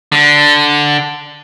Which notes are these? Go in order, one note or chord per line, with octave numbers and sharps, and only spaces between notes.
D3